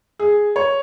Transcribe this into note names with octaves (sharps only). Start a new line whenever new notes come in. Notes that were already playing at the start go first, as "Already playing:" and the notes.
G#4
C#5